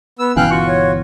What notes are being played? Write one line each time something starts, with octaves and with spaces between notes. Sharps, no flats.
B3 E6
G1 B2 E3 C#4 F5 G5 F#6
F4 F#4 C#6
C#5